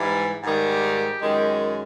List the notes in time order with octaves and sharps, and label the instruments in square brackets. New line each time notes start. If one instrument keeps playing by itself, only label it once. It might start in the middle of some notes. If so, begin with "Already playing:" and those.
Already playing: [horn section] G#2 E3 G3
G#2 D#3 G3 G4
F#2 D#3 G#3